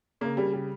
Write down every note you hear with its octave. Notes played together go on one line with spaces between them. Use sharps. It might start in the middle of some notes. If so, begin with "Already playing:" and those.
C#3 A#3
C#3 G3
G3